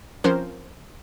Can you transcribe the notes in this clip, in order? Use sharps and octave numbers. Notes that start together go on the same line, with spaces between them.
F3 C4 C#4 A#4 C5